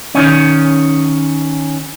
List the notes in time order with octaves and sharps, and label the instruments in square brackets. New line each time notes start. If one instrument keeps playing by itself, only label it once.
[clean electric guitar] D#3 C#4